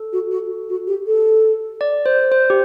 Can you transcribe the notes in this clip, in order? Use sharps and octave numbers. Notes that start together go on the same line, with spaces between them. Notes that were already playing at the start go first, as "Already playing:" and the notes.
Already playing: A4
F#4
F#4
F#4
G4
A4
D5
C5
C5
G4